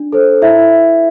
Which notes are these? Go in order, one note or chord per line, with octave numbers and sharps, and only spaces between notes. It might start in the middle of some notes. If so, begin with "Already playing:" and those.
Already playing: D4
A4 C5
E4 E5